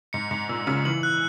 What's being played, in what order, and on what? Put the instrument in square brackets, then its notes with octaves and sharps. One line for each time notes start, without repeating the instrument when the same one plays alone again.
[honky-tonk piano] G#2 [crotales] C#7
[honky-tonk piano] G#2 [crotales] C#7
[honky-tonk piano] A#2 [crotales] E6
[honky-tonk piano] C#3 [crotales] E6
[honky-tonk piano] E3 [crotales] F#7
[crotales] F#6